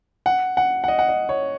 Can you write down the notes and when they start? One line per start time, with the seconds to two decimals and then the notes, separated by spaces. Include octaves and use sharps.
0.26 F#5
0.57 F#5
0.84 F#5
0.88 D#5
0.99 F#5
1.09 D#5
1.29 C#5